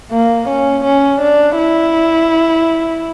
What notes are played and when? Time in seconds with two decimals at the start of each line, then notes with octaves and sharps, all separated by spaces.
0.12 A#3
0.48 C#4
0.84 C#4
1.21 D4
1.58 E4